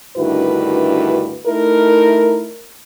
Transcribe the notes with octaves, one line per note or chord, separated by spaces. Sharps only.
D2 G2 D#3 E4 F#4 B4
A3 D#4 E4 A#4